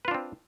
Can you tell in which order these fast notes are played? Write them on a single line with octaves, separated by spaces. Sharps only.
B4 F4 D4 C4